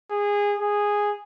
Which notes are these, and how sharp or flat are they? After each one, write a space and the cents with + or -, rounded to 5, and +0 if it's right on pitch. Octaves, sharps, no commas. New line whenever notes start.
G#4 -20
G#4 -10